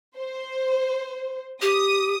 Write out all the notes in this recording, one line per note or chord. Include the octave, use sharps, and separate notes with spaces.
C5
G4 D#6